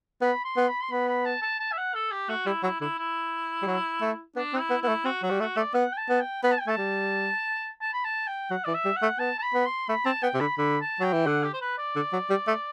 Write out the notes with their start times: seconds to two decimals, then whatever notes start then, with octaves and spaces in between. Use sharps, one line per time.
0.21 B3 B5
0.44 C6
0.57 B3
0.68 B5
0.82 C6
0.91 B3 B5
1.08 B5
1.25 A5
1.42 A5
1.60 A5
1.72 E5
1.78 F#5
1.94 A4
2.11 G4
2.29 A3 F#4
2.46 G3 E4
2.63 F#3 E4
2.81 D3 E4
2.98 E4
3.62 G3
3.67 F#3
4.01 A3
4.36 B3 D4
4.54 C4
4.59 E4
4.70 B3
4.82 B3 E4
4.88 A3
5.05 C4 F#4
5.23 F#3 F#4
5.31 G3
5.40 A3 F#4
5.57 A3 D5
5.74 B3 F#5
5.92 G5
5.97 A5
6.09 B3
6.20 G5
6.43 B3 B5
6.52 A5
6.60 G5
6.67 A3 A5
6.77 G3
7.81 A5
7.93 B5
8.04 A5
8.27 G5
8.50 F#3 F#5
8.64 E3 D5
8.74 E5
8.85 G3
8.96 F#5
9.02 A3
9.19 B3 A5
9.38 A5
9.42 B5
9.54 B3
9.66 C6
9.89 A3 B5
10.06 C4 A5
10.23 B3 G5
10.34 C3
10.40 D3 B5
10.57 D3 B5
10.81 A5
11.00 F#3 G5
11.13 E3
11.26 D3 F#5
11.44 G4
11.53 C5
11.61 B4
11.78 D5
11.96 D3
12.13 F#3
12.30 G3
12.48 A3